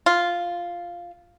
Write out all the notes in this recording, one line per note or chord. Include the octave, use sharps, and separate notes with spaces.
F4